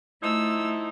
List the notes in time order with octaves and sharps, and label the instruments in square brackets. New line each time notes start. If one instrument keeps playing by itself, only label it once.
[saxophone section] F3 D#4 E4 [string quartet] A3 E6